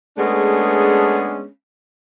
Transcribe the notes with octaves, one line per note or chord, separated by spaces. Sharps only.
G#3 A3 B3 C#4 D4 G#4